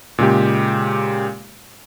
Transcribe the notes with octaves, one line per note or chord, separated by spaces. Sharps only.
A#2 C#3 G#3 G4